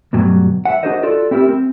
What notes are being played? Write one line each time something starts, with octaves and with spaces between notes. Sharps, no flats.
D2 G2 B2 F#3 G3
E5 F#5
D4 F#4 G#4 A#4 C5 D#5
F4 F#4 A4 D5
C4 E4 G4 G#4 A#4 E5
C4